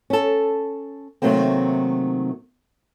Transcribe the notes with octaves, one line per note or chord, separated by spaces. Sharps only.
C#4 A4
C3 D#3 F#3 A3 A#3 C4